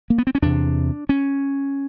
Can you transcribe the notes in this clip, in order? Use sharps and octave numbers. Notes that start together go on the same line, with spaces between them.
A#3
B3
C4
C#4
E2 C3 D4
C#4